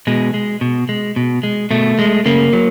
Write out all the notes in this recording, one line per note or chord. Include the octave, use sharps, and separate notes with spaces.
B2 G#3
G#3
B2
G#3
B2
G#3
B2 A3
G#3
C#3 A#3
F#3